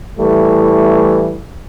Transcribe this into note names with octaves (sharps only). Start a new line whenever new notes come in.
A2 E3 G3 A3